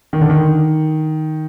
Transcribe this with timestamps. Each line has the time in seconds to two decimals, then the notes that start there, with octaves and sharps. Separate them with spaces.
0.13 D#3
0.21 D3
0.30 D#3